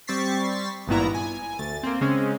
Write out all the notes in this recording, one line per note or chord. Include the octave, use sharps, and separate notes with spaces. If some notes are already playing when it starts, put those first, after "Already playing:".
G3 C4 C#6 A6 B6 C7
G#1 G2 A#2 B3 E4 A#5
G#5
D2 A6
A#3 C4
C#3 G#3 C4 C#4